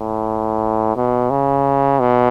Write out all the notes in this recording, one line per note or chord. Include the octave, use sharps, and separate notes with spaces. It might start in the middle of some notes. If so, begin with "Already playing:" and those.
Already playing: A2
B2
C#3
B2